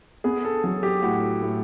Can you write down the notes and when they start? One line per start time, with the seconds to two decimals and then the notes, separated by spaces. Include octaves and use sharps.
0.24 B3 G#4
0.45 A4
0.64 F#3 A4
0.83 G4
1.02 A2 F#4
1.42 A2